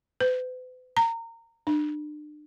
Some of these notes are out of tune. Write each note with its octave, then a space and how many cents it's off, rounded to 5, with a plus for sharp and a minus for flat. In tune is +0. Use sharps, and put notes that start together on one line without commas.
B4 +45
A#5 -25
D4 +35